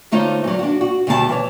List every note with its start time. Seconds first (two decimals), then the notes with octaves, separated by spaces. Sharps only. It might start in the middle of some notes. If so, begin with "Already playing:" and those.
0.12 D3 A3 D#4 F4 C5 C#5
0.44 E2 F#3
0.59 D4 F#4
0.81 F#4
1.07 D2 B2 D#3 G3 F#4 A5
1.29 E3 C#5